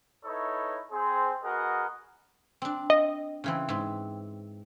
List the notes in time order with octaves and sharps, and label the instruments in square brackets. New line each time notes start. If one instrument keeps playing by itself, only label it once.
[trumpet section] D#4 E4 A4 B4 C#5
C4 G#4 C5
B3 F#4 G#4 A#4 D#5 F#5
[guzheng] C4 D4
[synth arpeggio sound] D#5
[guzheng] C#3 E3 C4
G#2 C4